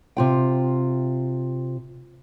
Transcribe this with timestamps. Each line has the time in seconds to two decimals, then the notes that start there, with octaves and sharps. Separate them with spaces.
0.17 C3 F4 G5